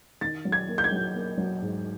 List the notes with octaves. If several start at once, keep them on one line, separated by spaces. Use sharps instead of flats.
D#3 A6
F#3
G#6
A#3
G6
G#6
F#3
A#3
F#3
G#2